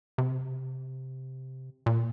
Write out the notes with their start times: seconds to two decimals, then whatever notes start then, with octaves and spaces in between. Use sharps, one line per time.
0.18 C3
1.86 A#2